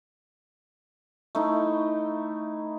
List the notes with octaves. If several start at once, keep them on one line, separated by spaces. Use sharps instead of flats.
A3 D#4 E4